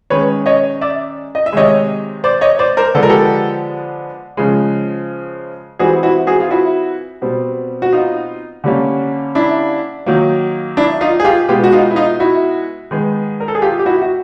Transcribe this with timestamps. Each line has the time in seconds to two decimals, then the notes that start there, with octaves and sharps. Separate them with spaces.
0.10 D#3 G#3 C#4 B4 C#5
0.46 C#5 D#5
0.81 D5 E5
1.35 D#5
1.46 E5
1.53 C3 D#3 G#3 C#5 D#5
2.24 C5 D5
2.41 C#5 D#5
2.59 C5 D5
2.77 A#4 C5
2.95 D3 F3 G#3 B3 A4
3.03 A#4
3.09 G4 A4
4.37 C#3 F3 G#3
5.79 E3 G3 C4 F#4 G#4
6.03 E4 F#4
6.27 F#4 G#4
6.40 F4
6.51 E4 F#4
7.22 B2 G3 C4
7.82 F#4
7.92 D#4 F4
8.64 D3 G3 A#3 C#4
9.35 D4 E4
10.06 D#3 F#3 A#3
10.77 D4 E4
11.01 D#4 F4
11.20 G#4
11.25 F4 G4
11.48 B2 G#3 B3 F4 G4
11.64 F#4
11.72 D#4 F4
11.91 E4
11.96 D#4 F4
12.20 E4 F#4
12.91 D#3 G#3 B3
13.40 A#4
13.48 A4
13.55 G#4
13.62 F4 G4
13.79 G4
13.86 E4 F#4
14.02 F#4